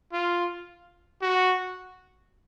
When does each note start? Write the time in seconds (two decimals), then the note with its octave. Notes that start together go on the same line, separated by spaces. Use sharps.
0.13 F4
1.22 F#4